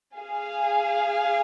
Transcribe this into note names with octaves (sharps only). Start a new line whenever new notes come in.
G#4 F5 G#5